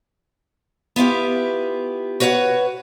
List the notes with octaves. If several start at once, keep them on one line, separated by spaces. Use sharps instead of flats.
B3 E4 F4 G4
F#4 B4 C#5 D#5 F#5